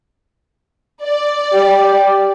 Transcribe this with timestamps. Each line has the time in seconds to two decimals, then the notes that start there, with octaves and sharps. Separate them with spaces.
1.05 D5
1.54 G4